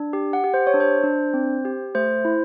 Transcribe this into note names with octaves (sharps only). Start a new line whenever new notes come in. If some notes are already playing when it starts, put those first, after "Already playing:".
Already playing: D4
G4
F#5
G4
C5
C#5
D4
C5
D4
C4
G4
A3 C5
E4